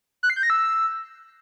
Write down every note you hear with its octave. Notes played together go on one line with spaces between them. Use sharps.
F#6
C7
G6
A#6
E6